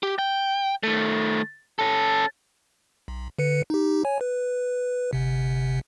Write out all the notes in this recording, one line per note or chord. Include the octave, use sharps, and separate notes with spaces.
G4
G5
D#3 A3
C#4 A4
B1
D3 B4 C#7
D#4 G4
C#5 G#5
B4
G1 C3